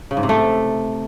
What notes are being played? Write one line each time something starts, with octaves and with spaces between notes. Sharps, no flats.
C#3
G#2
C3
A3